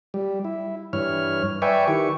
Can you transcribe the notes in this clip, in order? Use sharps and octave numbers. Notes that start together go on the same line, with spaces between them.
G3
E4
G2 E3 C#5 F6
B4 D5 E5 G5 G#5 C#6
D#3 E4 G4 C#6